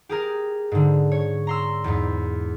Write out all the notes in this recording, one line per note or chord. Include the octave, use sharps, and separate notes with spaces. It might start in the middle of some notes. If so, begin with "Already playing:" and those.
G4 G#4 A#4
G#2 D3
C#5
A#5 C6 E6
E2 G#2